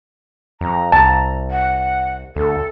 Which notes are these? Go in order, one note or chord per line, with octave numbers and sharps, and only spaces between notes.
F2 A#5
C2 A5
F#5
D2 A4